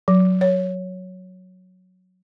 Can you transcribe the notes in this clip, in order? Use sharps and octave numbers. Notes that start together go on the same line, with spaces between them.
F#3
C#5